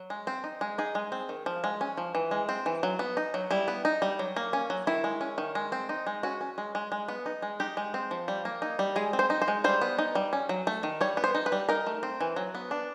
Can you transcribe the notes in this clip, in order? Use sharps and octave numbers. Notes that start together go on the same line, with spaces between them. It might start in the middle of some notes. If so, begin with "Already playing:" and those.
Already playing: F#3
G#3
C4
D#4
G#3
D#4 G#4
G#3
C4
D#3
F3
G#3
C#4
F3
E3
G#3
C4
E3
F#3
B3
D#4
F#3
G3 E4
B3
D#4
G3
F#3
A#3
C#4
F#3
D#3 E4
G#3
C#4
D#3
G#3
C4
D#4
G#3
C#4 F#4
C#4
G#3
G#3
G#3
B3
D#4
G#3
D#4 G4
G#3
C4
F3
G3
A#3
D#4
G3
G#3 G#4
C4
C5
D#4
C5
G#3
G3 C5
B3
D#4
G3
C#4
F#3
A3
D#3
G3 C#5
B3
C5
D#4
B4
G3
D#4 A#4
A3
C4
E3
F#3
B3
D4